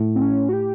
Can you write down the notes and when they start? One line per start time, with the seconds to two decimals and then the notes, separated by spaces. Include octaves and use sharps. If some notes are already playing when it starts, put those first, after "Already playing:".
Already playing: A2
0.15 C4
0.22 C#4
0.49 F#4
0.53 G4